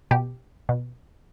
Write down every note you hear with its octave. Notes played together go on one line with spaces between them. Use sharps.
B2 G4
B2